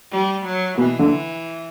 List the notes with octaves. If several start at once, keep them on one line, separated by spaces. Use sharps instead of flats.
G3
F#3
B2 E3
D3